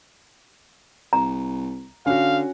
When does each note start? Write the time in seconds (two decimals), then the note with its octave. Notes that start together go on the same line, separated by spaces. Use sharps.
1.13 C2 A#5
2.06 D3 C#4 F#4 F5